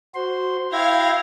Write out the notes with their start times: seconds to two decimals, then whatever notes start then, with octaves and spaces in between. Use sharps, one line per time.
0.14 F#4 C5 C6
0.72 E4 F5 G5 G#6 A#6